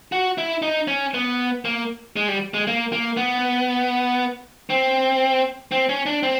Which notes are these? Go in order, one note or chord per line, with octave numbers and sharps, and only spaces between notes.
F#4
E4
D#4
C#4
B3
A#3
G#3
G3
G#3
A#3
A#3
B3
C4
C4
C#4
D4
C4